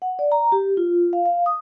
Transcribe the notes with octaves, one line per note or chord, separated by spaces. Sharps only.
F#5
D5
A#5
G4
F4
F5
F5
D#6